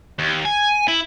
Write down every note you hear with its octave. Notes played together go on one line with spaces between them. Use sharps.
D#2
G#5
E4